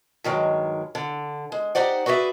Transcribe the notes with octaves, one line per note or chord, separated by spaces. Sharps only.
G2 D#3 F#3 G#3
D3
G#3
D#4 G4 C5 D5 F#5
F#4 G#4 B4 D5 E5